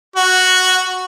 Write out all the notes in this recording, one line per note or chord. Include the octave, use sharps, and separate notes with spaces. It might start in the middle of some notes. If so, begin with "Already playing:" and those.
F#4